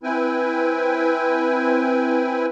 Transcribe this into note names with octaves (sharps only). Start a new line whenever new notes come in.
C4 E4 B4 G5 G#5